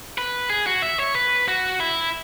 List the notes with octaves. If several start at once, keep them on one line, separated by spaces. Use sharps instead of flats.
B4
G#4
F#4
E5
C#5
B4
F#4
E4